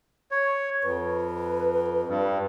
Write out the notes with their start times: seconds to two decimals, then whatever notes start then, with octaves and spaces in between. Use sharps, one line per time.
0.31 C#5
0.83 F2 B4
2.08 G2